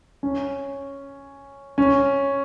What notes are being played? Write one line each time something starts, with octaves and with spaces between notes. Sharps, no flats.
C#4
C#4